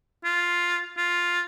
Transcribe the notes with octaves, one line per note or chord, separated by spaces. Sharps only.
F4
F4